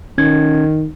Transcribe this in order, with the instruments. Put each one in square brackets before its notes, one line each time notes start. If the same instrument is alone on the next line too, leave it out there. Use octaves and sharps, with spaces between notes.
[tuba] D#3 [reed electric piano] C#4 G#6